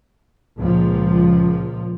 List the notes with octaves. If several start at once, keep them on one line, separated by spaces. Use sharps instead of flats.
C#2 A#2 F3